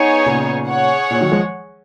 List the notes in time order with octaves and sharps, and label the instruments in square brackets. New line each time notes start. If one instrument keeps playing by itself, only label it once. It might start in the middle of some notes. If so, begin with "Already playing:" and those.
Already playing: [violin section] B3 D#4 G#4 C#5
[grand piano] A#2 C#3
[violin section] G#4 C#5 F#5
[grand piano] A#2
D#3 F#3
F3 G#3